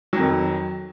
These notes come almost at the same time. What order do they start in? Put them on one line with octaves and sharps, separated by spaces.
F#3 F2 D#3